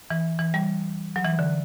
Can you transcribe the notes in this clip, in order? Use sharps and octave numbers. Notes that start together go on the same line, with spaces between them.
E3
E3
G3
F#3
E3
D3